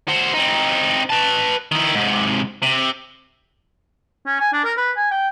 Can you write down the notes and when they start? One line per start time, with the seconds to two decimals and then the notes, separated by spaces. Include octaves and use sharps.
0.08 F#4 C5
0.34 C4 D#4
1.10 B4 A5
1.72 D#3 E4
1.94 G#2 C3
2.62 C3
4.26 C#4
4.40 G#5
4.53 D4
4.65 A#4
4.77 B4
4.96 G#5
5.11 G5